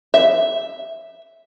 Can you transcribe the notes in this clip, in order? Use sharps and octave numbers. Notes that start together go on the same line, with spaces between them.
E5